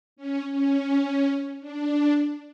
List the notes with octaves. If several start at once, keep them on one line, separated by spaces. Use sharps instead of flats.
C#4
C#4
D4